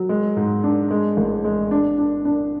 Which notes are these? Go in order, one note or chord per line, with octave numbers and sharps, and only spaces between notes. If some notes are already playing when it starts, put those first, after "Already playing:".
Already playing: F#3
G#3
G#2
D4
G#3
A1
G#3
D4
D4
D4